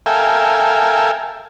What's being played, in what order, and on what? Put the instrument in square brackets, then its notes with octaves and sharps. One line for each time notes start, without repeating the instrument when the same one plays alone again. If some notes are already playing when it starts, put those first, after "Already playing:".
[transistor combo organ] A4 A#4 E5 F5 G5 G#5